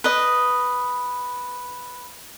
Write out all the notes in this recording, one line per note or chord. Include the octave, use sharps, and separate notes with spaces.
B4 D#5